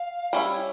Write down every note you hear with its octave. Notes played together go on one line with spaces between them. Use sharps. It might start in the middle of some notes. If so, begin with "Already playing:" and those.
Already playing: F5
G3 C#4 E4